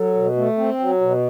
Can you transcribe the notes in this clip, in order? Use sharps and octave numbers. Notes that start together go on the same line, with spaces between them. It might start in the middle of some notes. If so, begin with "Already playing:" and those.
Already playing: F#3 A4
B2
A3
C4
F#3
B2